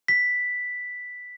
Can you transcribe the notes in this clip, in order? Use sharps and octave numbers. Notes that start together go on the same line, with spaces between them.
B6